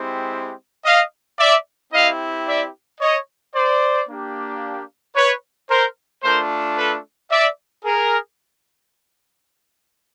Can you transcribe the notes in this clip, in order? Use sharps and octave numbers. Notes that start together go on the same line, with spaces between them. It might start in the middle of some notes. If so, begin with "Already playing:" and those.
Already playing: G#3 C4 E4 G4
D#5 F5
D5 E5
C4 E4 G4 D#5 F5
D5 E5
C#5 D#5
C5 D5
A#3 D4 G4
B4 C#5
A#4 C5
A3 D4 F4 A#4 C5
A4 B4
D5 E5
G#4 A#4